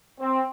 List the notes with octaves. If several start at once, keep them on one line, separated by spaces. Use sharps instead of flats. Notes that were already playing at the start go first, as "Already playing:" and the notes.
C4